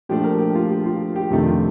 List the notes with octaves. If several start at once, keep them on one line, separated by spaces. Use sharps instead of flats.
A#2 F3 A3 D4 G4
A#4
G4
F4
G4
F4
G4
F2 C3 D#3 A3 D4 F4
F4